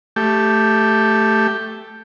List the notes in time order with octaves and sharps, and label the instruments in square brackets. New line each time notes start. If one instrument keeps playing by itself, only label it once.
[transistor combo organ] A3 G4